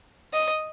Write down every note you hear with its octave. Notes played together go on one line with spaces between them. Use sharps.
D#5